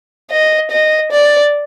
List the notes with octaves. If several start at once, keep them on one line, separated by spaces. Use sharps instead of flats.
D#5
D#5
D5